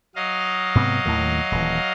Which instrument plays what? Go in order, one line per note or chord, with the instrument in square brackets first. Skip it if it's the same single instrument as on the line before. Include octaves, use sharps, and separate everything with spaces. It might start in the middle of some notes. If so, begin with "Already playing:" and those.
[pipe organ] F#3 D#5 F5
[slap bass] G#2 C3 B3
D#2 A2 D#3
D#1 E3